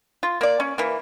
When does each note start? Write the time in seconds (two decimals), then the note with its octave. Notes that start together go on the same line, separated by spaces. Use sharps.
0.23 F4
0.41 A#3 D5
0.60 C#4
0.78 E3 A#3